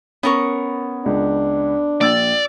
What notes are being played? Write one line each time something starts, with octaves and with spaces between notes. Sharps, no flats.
B3 C#4 A#4 C#6
C#2 D4
A#1 D5 E6 A6